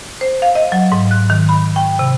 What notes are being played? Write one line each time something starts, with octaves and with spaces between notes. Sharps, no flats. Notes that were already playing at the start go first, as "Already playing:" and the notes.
C5
F5
D#5
F#3
G#2
F#6
D#3
B5
G5
C3